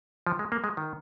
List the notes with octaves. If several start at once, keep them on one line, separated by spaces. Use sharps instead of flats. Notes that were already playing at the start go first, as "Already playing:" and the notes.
F3
G#3
A#3
G#3
D#3